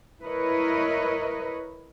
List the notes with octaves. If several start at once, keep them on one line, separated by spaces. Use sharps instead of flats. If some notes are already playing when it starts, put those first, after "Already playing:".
E4 A#4 B4 C#5 D#5